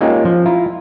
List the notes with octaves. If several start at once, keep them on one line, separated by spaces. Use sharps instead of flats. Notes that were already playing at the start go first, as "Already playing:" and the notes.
G#3 A#3 C#4 D#4 F4 G4
F3
E4 F4 A#5